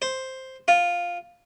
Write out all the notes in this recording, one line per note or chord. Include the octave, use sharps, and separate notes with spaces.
C5
F4